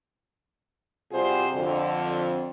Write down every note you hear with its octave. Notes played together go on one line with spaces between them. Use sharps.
C3 G3 F4 F#4 G#4 C5
F2 D3